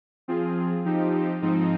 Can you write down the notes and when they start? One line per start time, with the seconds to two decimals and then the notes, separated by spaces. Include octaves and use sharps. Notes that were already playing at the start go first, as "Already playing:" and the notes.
0.28 F3 C4 F4 G#4
0.85 F3 C4 D#4 G4
1.42 G#2 F3 C4 D#4